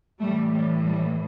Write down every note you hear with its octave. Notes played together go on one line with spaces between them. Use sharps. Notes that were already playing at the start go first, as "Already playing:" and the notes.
A2 E3 G3 A3
G3
G3